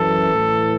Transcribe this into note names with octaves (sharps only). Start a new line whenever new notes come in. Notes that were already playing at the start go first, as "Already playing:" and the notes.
Already playing: F#2 E3 A4
A2 E3